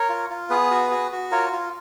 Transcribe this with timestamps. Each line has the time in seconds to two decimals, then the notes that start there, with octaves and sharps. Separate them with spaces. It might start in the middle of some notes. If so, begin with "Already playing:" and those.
Already playing: A#4 C#5
0.09 F4
0.30 F4
0.50 B3 G#4 B4
0.71 F#4
0.91 F#4
1.12 F#4
1.31 F4 A#4 C#5
1.53 F4